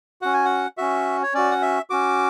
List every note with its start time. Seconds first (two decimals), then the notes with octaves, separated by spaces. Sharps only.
0.22 C#4 F#4 F#5
0.34 G#5
0.45 F#5
0.78 C#4 F#4 E5
1.23 C#5
1.34 C#4 F#4 D5
1.51 F#5
1.62 E5
1.90 C#4 F#4 D6